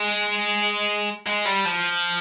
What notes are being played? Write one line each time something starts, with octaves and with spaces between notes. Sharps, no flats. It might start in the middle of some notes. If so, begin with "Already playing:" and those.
Already playing: G#3
G#3
G3
F3